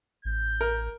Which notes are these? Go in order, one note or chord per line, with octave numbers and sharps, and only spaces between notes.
A1 G6
A#4